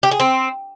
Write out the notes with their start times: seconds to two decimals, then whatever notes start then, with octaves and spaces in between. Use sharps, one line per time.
0.03 G4
0.11 G#4
0.20 C4